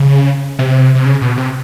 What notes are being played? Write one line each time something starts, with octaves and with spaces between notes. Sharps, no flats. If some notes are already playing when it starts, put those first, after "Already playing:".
Already playing: C#3
C3
C3
C#3
B2
C3